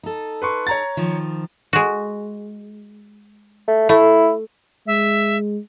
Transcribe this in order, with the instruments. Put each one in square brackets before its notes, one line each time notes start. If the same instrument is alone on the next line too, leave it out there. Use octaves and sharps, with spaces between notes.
[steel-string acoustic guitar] D#4 A4
[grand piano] B4 C6 C#6
C#5 A#5 A6
[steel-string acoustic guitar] D#3 F3
[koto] G#3 F#4
[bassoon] A3
[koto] A3 [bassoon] E4
[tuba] G#3 [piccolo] E5